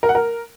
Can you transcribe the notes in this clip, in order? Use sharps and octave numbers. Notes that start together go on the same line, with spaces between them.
A#4
F#5
A#4